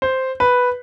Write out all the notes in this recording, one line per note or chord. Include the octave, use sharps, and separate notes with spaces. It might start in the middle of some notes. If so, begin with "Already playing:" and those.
C5
B4